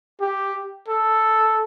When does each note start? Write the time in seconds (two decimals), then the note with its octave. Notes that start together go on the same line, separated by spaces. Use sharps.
0.21 G4
0.88 A4